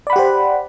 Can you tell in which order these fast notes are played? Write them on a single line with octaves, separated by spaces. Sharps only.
D5 B5 F#5 G4 C5